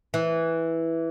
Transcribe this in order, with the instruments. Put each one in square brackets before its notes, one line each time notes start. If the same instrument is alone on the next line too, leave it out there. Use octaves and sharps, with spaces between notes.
[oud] E3